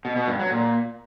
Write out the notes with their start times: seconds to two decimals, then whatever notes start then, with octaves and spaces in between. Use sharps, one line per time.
0.05 B2
0.16 B2
0.28 G2
0.39 F#3
0.51 A#2